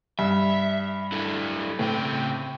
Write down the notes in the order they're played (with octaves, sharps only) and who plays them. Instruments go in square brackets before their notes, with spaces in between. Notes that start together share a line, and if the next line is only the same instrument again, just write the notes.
[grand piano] G2 [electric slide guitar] E5
[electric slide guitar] D4 E4 A4
[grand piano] A2 [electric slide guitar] C#3 C4 G5